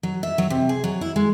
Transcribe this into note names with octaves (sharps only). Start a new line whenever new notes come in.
F#3
E5
F#3
C3
G#4
F#3
E4
G#3